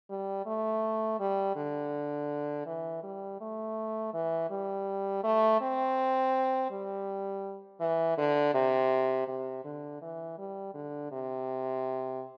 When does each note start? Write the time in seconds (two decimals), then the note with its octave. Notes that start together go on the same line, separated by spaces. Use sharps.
0.10 G3
0.46 A3
1.20 G3
1.56 D3
2.66 E3
3.03 G3
3.41 A3
4.14 E3
4.50 G3
5.24 A3
5.61 C4
6.71 G3
7.81 E3
8.18 D3
8.54 C3
9.28 C3
9.64 D3
10.02 E3
10.38 G3
10.74 D3
11.11 C3